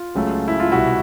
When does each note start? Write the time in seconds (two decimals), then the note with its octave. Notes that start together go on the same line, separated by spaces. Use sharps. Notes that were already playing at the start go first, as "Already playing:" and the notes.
Already playing: F4
0.15 C#2 C#3 F#3 A3
0.48 E4
0.60 F4
0.72 C2 B2 G3 E4 F#4